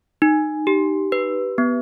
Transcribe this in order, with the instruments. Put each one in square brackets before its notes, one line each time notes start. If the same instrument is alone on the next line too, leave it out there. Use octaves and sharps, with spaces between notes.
[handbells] D#4
G4
B4
B3